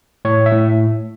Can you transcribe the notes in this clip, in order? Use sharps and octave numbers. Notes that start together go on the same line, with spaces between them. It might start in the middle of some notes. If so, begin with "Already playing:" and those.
A2 C#5
E5
A2